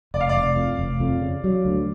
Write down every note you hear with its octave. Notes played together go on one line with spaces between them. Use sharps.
F1 D5
F5
D5
F1
F2
F1
F2
C#3
F#3
D2